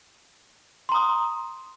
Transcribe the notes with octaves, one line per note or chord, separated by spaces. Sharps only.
A#5 C6 D#6